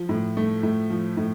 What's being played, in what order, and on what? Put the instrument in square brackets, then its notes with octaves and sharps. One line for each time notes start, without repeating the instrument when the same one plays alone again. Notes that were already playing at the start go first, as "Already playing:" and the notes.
Already playing: [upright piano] F3
A2
A3
A2
F3
A2